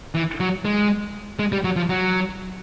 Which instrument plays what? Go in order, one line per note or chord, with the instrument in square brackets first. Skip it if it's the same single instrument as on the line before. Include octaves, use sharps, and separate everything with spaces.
[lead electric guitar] E3
F#3
G#3
G#3
G3
F#3
F3
F#3